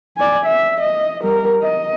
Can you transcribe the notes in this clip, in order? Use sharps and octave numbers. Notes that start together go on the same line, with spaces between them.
D5 G#5
E5
D#5
G3 A#4
D#5